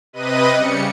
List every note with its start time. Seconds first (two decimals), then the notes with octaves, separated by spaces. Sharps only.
0.13 C3 B4 D#5 D#7
0.55 C#3 G3 C#7